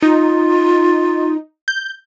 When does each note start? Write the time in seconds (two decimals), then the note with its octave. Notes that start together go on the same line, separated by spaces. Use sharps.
0.02 D#4 F4
1.68 G6